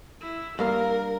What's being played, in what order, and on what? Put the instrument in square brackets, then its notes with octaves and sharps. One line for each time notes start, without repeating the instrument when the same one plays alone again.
[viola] E4
[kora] G2 A#3 F5 [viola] A#4